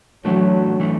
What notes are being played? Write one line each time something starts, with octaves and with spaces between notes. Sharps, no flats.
E3 F#3 A3 D4 F#4
E3 A3 D4